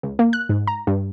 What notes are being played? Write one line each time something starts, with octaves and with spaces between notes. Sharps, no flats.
C#2
A#3
F#6
G#2
A#5
G2